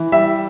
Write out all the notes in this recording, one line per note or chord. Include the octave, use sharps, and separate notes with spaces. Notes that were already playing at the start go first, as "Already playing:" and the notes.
Already playing: E3
G3 E5